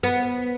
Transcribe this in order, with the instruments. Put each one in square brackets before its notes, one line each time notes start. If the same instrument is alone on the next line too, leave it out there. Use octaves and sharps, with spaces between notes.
[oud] B3